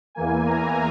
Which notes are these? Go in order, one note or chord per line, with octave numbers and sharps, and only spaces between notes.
E2 E3 A#3 G#5
A#5